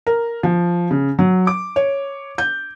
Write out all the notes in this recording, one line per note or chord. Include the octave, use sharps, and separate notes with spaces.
A#4
F3
C#3
F#3
D6
C#5
G6